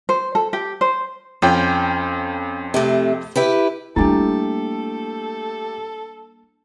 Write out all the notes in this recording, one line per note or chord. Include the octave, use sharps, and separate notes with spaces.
C5
A4
G4
C5
F2 C#4 F4 G5
C3 A3
E4 G4 B4
G3 A3 A#3 D4 E4 G4 A4